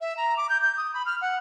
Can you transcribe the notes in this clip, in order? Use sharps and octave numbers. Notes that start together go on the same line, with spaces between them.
E5
A#5
D6
G6
G6
D#6
B5
F6
F#5